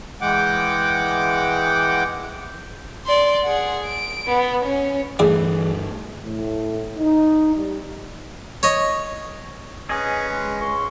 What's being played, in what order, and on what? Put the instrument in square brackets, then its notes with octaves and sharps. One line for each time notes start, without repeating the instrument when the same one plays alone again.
[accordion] E3 G#3 F#5 G5 D6
[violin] D5 C6
G#4 F#5
D7
B3
C#4
[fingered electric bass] D2 G2 A3 [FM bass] E3 [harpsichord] E4 G#4 D5
[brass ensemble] A2
D#4
G3
[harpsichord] C#5 D#5
[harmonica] C#4 B4 [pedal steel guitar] G#4 D#5
[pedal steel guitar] G#3
[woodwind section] C#2 C6 C#6